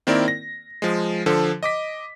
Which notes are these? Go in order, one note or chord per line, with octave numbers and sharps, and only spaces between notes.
D#3 A#3 C4 E4 A#4 D5
A#6
F3 G#3
D3 F3 A4 C5
D#5 D6 B6